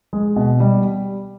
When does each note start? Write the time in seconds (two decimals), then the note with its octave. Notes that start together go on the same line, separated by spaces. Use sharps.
0.13 G#3
0.36 B2
0.60 G3